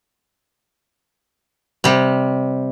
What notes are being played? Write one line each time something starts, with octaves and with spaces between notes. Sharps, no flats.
C3 G3